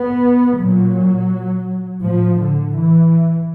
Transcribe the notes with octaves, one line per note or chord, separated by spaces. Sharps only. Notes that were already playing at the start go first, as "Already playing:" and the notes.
Already playing: B3
A#2 F#3
A2 F3
D3
E3